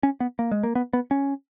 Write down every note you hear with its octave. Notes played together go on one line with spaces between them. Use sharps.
C#4
B3
A#3
G#3
A#3
B3
B3
C#4